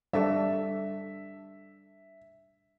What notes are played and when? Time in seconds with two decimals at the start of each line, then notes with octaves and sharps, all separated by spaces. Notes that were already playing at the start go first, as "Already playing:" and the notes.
0.13 G3 D4 A4 E5